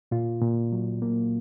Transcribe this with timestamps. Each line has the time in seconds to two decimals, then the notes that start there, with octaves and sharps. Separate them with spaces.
0.11 A#2 F4
0.42 A#2
0.72 F#3
1.02 A#3